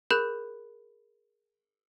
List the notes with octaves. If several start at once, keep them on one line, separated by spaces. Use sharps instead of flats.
G#4 A#4 B5 F#6 G6